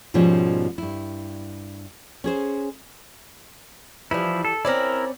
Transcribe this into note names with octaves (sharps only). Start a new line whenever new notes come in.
G#2 B2 F3 G3 G#3 C#4
G2 E4
C#4 G#4 C5
E3 F3 G3 E4
A4
C4 C#4 E4 A#4 D5